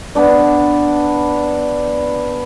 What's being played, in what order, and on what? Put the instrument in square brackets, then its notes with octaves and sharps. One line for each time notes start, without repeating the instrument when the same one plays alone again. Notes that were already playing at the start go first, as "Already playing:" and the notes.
[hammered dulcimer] B3 D4 D5